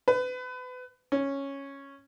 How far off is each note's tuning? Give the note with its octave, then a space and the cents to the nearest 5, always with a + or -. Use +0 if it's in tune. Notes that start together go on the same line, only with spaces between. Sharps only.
B4 +30
C#4 -5